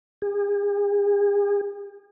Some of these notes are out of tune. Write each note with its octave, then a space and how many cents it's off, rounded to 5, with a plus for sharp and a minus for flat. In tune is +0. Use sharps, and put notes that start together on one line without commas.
G#4 -40